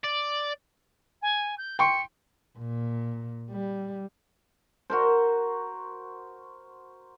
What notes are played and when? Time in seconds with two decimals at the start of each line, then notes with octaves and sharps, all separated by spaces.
0.04 D5
1.22 G#5
1.57 G6
1.79 G5 C6 C#6 C#7
2.58 A#2
3.51 G3
4.90 F#4 A#4 C5